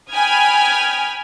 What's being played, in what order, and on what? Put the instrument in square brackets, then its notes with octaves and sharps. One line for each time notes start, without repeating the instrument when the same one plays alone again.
[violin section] G5 G#5 B5 D#6 F6 G#6